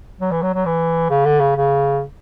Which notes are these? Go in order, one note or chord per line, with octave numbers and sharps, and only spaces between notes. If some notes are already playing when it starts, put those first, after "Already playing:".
F#3
E3
F#3
F#3
E3
C#3
D3
C#3
C#3